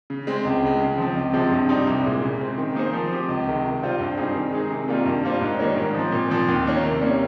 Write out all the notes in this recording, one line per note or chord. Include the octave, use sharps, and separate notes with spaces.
C#3
G#3 C4
C#2
C#3 G#3
C#3
F3 C4
C#2
C3 F3 G#3
G2
G3 C4 D#4
C2
A#2 G#3
C#3
G#3 C4
D#3
A#3 D#4 G#4 C5
F3
C4 G4
C#2
C3 D#3 G#3
C3
G3 C4 F4 C5
G2
G3 C4 D#4 G#4
D#3
G#3 D#4 G#4
C3
D#3 G3 A#3 F4
G2
G3 A#3 F4 C5
G#2
D#3 G3 A#3 C#4
G#2
F3 C4
A#2
F3 C4
D#2
D#3 A#3 C#4
C3
G3 A#3 C#4